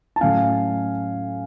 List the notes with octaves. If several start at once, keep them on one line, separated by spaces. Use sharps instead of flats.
A5
A2 F#3 C#4 F5 G#5